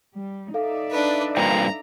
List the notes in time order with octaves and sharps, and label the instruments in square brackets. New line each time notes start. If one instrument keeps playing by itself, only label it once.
[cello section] G3
[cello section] D#4 D5 E5 [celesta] A4 F5
[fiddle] D4 B4
[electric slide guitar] G2 A#2 C4 [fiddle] A#5